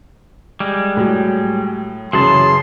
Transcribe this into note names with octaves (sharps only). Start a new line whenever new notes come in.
G3 G#3
A2 F#3
F#2 C#3 E3 G#4 A5 C6